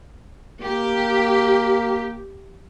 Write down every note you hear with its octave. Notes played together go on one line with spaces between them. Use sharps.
A#3 G4